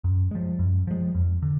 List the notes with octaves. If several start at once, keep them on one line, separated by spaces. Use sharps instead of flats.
F#2
F3 G#3
F#2
F3 G#3
F2
D3